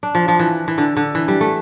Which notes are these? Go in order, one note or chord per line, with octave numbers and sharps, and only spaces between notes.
D4
F3
F3
E3
E3
D3
D3
E3
G3
A3